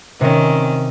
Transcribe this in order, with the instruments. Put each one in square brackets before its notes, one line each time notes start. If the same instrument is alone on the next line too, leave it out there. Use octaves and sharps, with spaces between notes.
[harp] C3 C#4 [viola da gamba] D#3